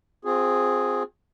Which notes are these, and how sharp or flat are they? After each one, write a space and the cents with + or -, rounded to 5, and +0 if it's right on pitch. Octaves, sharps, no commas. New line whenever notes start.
C4 +0 F4 +35 G#4 +0